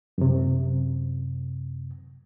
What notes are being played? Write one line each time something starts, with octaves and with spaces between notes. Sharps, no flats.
F#2 C3